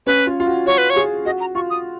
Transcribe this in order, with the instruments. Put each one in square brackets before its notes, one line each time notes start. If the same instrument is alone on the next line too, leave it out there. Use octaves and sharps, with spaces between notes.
[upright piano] C#4 [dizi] B4
[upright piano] F4
F4
F#4
[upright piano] F#4 [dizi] C#5
[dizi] B4
C#5
[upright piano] G#4
[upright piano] F#4 [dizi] D#5
[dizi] A#5
[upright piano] F4 [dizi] C#6
[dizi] D#6